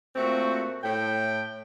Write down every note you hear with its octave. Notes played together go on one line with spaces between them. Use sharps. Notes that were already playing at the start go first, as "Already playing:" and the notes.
A#2 A3 C4 F#4
A2 G5